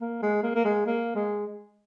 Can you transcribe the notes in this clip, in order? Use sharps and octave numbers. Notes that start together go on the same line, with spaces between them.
A#3
G#3
A#3
A#3
G#3
A#3
G#3